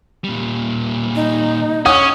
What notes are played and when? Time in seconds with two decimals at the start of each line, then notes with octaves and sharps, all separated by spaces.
0.24 A#2 G3
1.16 D#4
1.85 C#4 C#5 F#5 D#6